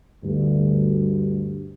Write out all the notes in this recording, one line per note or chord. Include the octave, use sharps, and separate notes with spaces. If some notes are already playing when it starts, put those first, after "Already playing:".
D2 G2